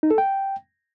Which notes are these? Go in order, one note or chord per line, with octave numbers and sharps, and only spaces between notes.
D#4
A4
G5